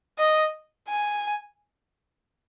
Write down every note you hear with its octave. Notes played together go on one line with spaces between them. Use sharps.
D#5
G#5